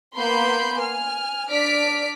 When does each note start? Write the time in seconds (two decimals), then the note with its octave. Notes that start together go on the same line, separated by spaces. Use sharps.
0.16 A#3 B3 B5 C6 G6
0.80 G#5 F6
1.49 D4 D5 F6 B6 D7